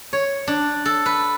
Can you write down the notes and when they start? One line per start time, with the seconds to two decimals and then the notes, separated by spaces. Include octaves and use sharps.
0.13 C#5
0.47 D4
0.85 A4
1.06 B4